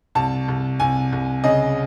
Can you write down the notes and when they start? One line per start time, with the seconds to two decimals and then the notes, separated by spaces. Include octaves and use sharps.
0.15 C2 A5
0.48 C2
0.80 C2 G#5
1.12 C2
1.44 C#3 D#5